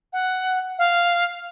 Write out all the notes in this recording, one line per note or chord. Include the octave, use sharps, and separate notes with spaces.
F#5
F5